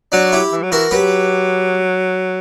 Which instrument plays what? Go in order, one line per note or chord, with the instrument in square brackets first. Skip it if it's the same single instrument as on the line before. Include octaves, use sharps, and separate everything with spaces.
[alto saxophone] F#3 [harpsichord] D4 F#4
[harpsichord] E4 G4
[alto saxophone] E3
F#3
[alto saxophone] E3 [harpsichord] F#4 A#4
[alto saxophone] F#3 [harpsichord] G4 B4